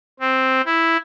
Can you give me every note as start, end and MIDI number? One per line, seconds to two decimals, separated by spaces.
0.20 0.61 60
0.65 0.97 64